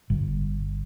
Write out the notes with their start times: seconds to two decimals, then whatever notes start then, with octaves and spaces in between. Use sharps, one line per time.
0.10 G1